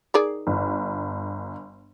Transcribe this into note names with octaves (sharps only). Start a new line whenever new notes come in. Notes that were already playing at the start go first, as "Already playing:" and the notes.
D#3 G#4 D5
G1